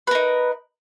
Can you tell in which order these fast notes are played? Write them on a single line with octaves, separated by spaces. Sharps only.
B4 A#4 D#4